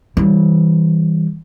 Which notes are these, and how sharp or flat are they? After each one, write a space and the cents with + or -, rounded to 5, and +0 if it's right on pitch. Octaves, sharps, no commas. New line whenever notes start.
E3 -25 G3 +0